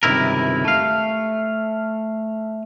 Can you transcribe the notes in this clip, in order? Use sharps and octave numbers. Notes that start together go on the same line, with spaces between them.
C#2 G2 C3 D#3 E4 A#4
A3 F5